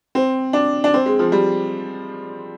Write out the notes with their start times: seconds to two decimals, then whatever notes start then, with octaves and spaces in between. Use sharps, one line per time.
0.15 C4
0.53 D4
0.84 D4
0.94 C4
1.06 G#3
1.19 F3
1.32 G3